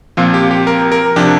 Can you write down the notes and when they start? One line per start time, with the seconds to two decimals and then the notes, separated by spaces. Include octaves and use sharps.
0.17 A#2 F3 C4 F4
0.34 G4
0.51 G4
0.67 A#4
0.92 A#4
1.16 C3 F3 D4 G4